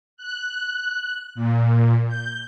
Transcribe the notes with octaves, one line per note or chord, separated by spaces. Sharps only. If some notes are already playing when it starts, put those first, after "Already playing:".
F#6
A#2
G6